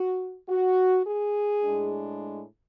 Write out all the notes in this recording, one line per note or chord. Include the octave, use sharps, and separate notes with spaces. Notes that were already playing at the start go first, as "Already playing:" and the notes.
Already playing: F#4
F#4
G#4
A2 G#3 D4